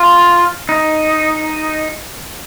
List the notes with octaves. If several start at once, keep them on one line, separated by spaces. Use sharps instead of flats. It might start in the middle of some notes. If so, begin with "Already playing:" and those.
Already playing: F4
D#4